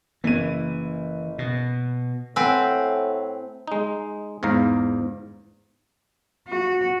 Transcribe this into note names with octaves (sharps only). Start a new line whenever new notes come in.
F#1 E3 D#7
B2
A2 C4 B4 F#5 G#5 E6
G#3 D#4
E2 G#2 F5 A#5
F#4